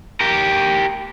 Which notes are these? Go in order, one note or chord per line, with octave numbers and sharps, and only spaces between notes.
G4 A#4